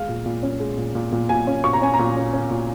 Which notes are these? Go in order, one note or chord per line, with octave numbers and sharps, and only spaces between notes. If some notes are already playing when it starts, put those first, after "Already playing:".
Already playing: G#3 F5
A#2
A#2
C#4
G#3
A#2
A#2
A#2
A#2 G#5
C#4
A#2 C#6
A#5
C#4 G#5
A#5
A#2
C#4
C#4
A#2